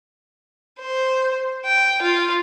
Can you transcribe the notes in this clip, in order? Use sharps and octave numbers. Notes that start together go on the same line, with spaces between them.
C5
G5
F4